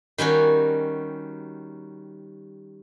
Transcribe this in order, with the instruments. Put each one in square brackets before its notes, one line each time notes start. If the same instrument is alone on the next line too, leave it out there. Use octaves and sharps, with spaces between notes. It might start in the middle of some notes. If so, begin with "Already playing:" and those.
[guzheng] D#3 G3 C#4 F#4